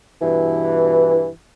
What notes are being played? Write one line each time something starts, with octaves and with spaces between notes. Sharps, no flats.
G2 B2 E3